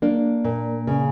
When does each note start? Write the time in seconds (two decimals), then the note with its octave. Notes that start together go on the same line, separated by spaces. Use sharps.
0.02 A#3 D4
0.44 A#2
0.87 C#3